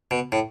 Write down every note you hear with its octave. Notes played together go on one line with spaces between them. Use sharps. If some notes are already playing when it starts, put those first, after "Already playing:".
B2
A2